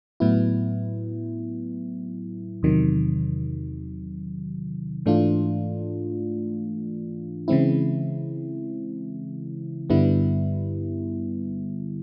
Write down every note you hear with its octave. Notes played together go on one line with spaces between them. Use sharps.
A2 F#3 B3 E4
E2 C3 D#3 F#3
G#2 E3 A3 D4 F4
C#3 E3 G#3 C4 E4
G2 D3 G3 B3 E4